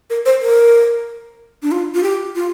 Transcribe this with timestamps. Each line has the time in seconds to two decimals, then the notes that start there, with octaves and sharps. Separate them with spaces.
0.10 A#4
0.26 C5
0.41 A#4
1.63 D4
1.72 F4
1.95 F4
2.03 G4
2.36 F4